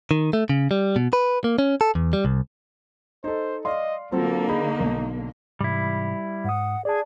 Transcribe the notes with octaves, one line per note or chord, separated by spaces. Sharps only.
D#3
A3
C#3
G3
B2
B4
A#3
C#4
A4
E2
G3
C2
D#4 A4 C5
D5 D#5 F5 C6
D3 F#3 A#3 C4 F4 A4
D#4 G#4 B5
B1
G#2 C3 E3 G3 E4
G#2 F#5 D#6
G#4 D5 A5